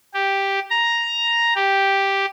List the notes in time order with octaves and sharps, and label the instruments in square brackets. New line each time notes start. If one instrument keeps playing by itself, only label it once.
[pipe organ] G4
A#5
G4